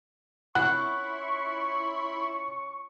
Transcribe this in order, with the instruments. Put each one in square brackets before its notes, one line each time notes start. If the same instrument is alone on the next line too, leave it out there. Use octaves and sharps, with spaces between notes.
[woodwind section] C#4 F4 C#6 [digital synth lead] E4 [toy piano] A#4 F#5 [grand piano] F#6